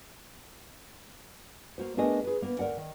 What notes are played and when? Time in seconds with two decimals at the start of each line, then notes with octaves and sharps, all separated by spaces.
1.78 A#3 F#4 C5
1.97 A3 B3 D4 G#4 A#4 D#5
2.24 G#4 B4
2.42 A#3 B3
2.59 D2 A#4 D5 F#5
2.77 D#3